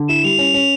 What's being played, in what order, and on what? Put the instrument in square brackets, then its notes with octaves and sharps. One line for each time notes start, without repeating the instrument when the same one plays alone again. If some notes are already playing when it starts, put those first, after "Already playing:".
Already playing: [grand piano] D3
[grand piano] E4 [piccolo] E7
[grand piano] G3 [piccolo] F7
[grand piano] C#4
C#4